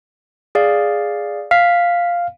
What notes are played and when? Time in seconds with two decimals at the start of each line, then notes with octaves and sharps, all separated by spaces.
0.55 G#4 D5 F5
1.51 F5 B6